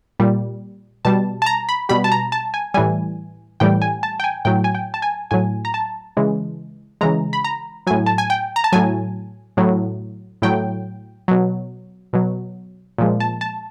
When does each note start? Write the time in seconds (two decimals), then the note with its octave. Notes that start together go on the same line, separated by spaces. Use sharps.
0.19 A#2 G3
1.05 B2 G3 A5
1.42 A5
1.46 A#5
1.69 B5
1.89 B2 G3 B5
2.04 A5
2.12 A#5
2.32 A5
2.54 G#5
2.74 A2 E3 G3 G#5
3.60 A2 E3 G3 G5
3.82 G#5
4.03 A5
4.20 G5
4.24 G#5
4.45 A2 F#3 G5
4.64 G#5
4.75 G5
4.94 A5
5.02 G#5
5.31 A2 F#3 G#5
5.65 A#5
5.74 A5
6.17 C#3 E3 G#3
7.01 C#3 E3 G#3 A#5
7.33 B5
7.44 A#5
7.87 A2 F#3 G#5
8.06 A5
8.18 G#5
8.30 G5
8.56 A#5
8.64 A5
8.72 A2 F#3 G#5
9.57 A2 F#3
10.42 A2 F#3 G5
11.28 B2 F#3
12.13 B2 F#3
12.98 A#2 F3 G#3
13.20 A5
13.41 A5